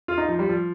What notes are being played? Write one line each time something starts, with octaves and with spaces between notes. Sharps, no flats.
F4
D#4
F3
G3
F3